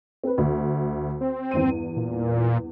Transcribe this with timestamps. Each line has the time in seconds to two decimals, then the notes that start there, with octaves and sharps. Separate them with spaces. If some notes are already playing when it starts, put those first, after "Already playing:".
0.24 C4 B4
0.38 D2
1.21 C4
1.51 E2 G2 D#7
1.97 A#2